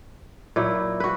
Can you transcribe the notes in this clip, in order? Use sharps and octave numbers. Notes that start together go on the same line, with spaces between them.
A#2 F#3 E4
F#4 B4